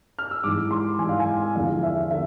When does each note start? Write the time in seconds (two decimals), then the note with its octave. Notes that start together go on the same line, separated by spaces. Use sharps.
0.19 F6
0.31 E6
0.44 G#2 E3 D6
0.71 C6
0.99 G#2 E3 G#5
1.09 F5
1.20 G#5
1.55 E2 D3 F3 F5
1.83 E5
2.11 D3 E5